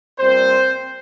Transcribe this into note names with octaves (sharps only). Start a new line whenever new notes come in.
A#2 G3 A#3 C4 C5